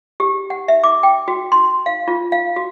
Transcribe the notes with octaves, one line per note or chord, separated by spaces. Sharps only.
G4
F#5
E5
D6
G5
F#4
C6
F5
F4
F5
F#4